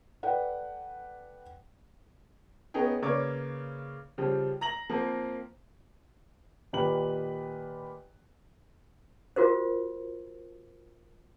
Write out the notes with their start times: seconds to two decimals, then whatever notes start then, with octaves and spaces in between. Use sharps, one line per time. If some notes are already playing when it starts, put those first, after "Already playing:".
0.23 A4 B4 D5 F#5 G5
2.74 B3 C#4 D#4 G#4 G5
3.02 C#3 A#3 B4 C#5 D5 D6
4.18 C#3 F3 G3
4.61 A#5 A#6 F#7
4.89 F3 A#3 C4
6.73 A#2 D#3 G4 B4 F#7
9.36 F4 F#4 A#4 C5